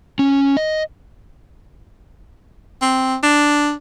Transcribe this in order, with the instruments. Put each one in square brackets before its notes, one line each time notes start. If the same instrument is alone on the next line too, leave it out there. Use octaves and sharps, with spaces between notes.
[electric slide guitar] C#4
D#5
[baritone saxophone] C4
D4